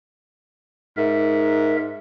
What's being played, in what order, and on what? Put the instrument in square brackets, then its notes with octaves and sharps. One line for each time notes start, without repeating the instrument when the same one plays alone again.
[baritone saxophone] G#2 [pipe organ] A#4 E5